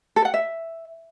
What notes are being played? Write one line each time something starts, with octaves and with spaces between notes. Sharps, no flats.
A4
F#5
E5